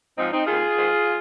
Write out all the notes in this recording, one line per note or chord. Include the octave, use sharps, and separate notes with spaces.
G#2 F3 C4 D#4
C4 D#4
D#2 D#3 F4 G#4
G#2 D#3
F3